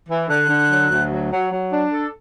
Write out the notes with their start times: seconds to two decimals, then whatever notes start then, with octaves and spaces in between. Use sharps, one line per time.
0.09 E3
0.29 D3 F#6
0.49 D3
0.70 F#3
0.91 D2
1.10 F#3
1.32 F#3
1.52 F#3
1.71 D4
1.92 A4